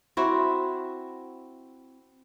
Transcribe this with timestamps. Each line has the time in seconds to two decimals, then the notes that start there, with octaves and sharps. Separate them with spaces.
0.17 C4 E4 F#4